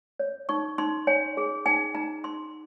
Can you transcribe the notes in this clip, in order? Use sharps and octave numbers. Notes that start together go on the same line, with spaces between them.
C#5
D#4 C#6
D#4 C6
C#5 G#5
G#4
D#4 G#5
D#4 A#5
D#4 C6